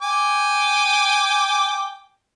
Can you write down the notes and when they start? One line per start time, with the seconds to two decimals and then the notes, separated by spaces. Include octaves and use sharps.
0.02 G5 G#5 D6